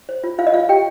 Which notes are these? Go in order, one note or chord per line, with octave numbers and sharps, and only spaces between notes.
C5
F4
F4 F5
D#5
F4 F5
G4 G5